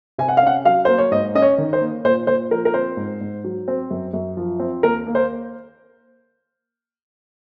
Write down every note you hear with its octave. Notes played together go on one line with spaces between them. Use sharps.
C3 G#5
F#5
F5
C#4 F#5
F#3 F5
A#3 C5
C#5
G#2 D#5
C#4 D#5
C#5
D#3
C5
A#3
A#2 C5
A#2 C5
F3 A#4
A#4
C4 C5
G#2
G#2
F#3
C4
F#2
F#2
F3
C4
D#2 A#4
A#3
C5